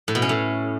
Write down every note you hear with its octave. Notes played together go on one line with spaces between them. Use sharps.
A2
B2
C#4
A2